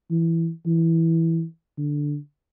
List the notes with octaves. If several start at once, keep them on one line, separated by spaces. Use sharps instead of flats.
E3
E3
D3